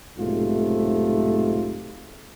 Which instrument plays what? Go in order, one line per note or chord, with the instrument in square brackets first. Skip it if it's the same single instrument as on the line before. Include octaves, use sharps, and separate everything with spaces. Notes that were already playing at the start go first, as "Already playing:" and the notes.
[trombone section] B1 G#2 C3 A3 F4